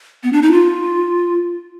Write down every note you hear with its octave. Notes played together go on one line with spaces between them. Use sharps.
B3
D4
D#4
F4